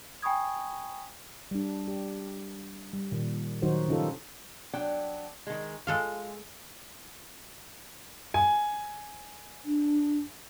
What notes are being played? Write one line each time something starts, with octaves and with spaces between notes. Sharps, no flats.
G5 G#5 B5 C#6 D#6 G#6
G3 D4
G4
G3
A#2 D#3
D#3 F#3 D#4 F#4 C5
C#3 C#4 D#4 F4 G4 A4
F#3 D4 G5
D#3 G#3
G#3 F4 A4 F5
G#5
D4